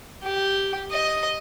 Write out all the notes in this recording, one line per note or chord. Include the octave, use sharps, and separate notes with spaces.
G4
D#5